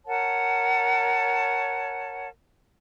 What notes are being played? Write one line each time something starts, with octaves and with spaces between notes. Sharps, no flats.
A#4 C#5 F#5 A5